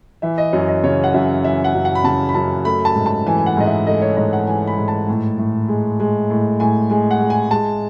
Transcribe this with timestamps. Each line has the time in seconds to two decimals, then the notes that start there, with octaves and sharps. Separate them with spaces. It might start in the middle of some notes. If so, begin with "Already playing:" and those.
0.22 E3 E5
0.38 D#5
0.52 F#2 C#5
0.68 D#5
0.84 C#3 C#5
1.04 F#5
1.14 F#2 E5
1.44 E3 E5
1.64 F#5
1.74 F#2
1.85 F#5
1.95 B5
2.04 C#3 A5
2.29 B5
2.34 F#2 A5
2.65 A3 B5
2.85 A5
2.95 G#2
3.06 A5
3.26 E3 G#5
3.38 G#5
3.46 F#5
3.57 G#2 D#5
3.66 E5
3.86 A3 D#5
4.01 C#5
4.16 G#2 D#5
4.33 F#5
4.47 E3 G#5
4.67 B5
4.77 G#2
4.88 A5
5.08 A2
5.38 A2
5.69 G#3
6.00 G#3
6.30 A2
6.60 A2 G#5
6.90 G#3 G#5
7.11 F#5
7.21 G#3
7.30 G#5
7.51 G#3 A5